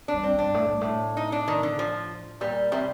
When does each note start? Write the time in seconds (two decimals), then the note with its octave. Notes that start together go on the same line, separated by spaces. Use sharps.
0.08 G2 D4
0.23 C4
0.34 G2 D4
0.54 A2
0.68 G2
0.81 A2
1.17 D#4
1.32 D4
1.48 D#3
1.63 D3
1.79 F3
2.41 A#2 G3
2.72 C3 G3